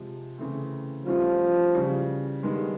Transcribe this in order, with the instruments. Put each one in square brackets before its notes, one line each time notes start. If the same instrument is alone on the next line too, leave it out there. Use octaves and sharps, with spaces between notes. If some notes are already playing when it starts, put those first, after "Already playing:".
Already playing: [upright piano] C3 F3 G#3
C#3 E3 A3 C4
[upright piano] G2 E3 A3 C#4 F4 [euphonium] F3
[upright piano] C#3 E3 G3
G2 D#3 G#3 B3